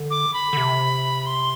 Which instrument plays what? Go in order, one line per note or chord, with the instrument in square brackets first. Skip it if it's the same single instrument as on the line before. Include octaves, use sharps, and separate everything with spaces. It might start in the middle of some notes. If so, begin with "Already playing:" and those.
Already playing: [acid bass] D3
[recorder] D6
B5
[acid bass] D3
C3
[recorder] C6